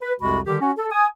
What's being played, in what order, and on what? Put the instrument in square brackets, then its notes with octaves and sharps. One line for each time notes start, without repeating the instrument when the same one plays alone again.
[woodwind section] B4
C2 F2 C3 G#3 F#4 B5
D3 D#3 G3 G4
C#4 F#4
A4
G#5 D#6